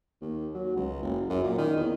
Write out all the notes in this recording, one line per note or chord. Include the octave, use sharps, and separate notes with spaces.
D#2
F#3
C#2
F#1
F#2
A#2
D#3
E2